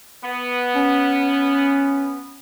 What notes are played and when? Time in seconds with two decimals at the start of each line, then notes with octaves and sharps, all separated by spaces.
0.24 B3
0.76 C#4